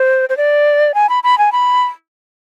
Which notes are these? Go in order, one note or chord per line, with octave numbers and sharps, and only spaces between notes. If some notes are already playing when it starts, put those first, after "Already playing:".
Already playing: C5
C5
D5
G#5
B5
B5
G#5
B5